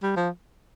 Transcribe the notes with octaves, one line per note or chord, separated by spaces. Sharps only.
G3
F3